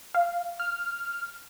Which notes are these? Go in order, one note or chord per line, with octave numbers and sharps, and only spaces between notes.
F5
F6